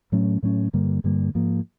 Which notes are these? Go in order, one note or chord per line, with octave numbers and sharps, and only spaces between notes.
A2 F#3 A3 C#4
A2 F#3 A3 C#4
G2 D3 G3 A#3
G2 D3 G3 A#3
G#2 F3 A#3